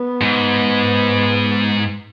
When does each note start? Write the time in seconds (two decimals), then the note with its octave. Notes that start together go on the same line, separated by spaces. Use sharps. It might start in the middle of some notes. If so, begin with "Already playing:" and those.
Already playing: B3
0.21 G#2